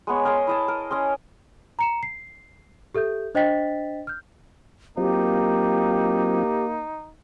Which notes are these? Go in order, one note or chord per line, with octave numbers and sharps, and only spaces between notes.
G#3 B3 C#5
A#4 D#5 G#5 C6
E4 D#5 A5
A#4
C#4 D#5 C6
A#5 C#7 E7
C7
G4 A4 E5 G6
D4 C5 D#5 G5 A6 B6
F6 G6
F#3 A#3 C4 D#4 F4 G4